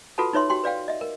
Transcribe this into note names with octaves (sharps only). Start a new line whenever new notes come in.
F4 F#4 A4 B4 F#5 A5
D#4 B4 C#5 E5 C6
F#4 G4 G5 C6
B4 D5 F5 G5
D#5 E5
A#4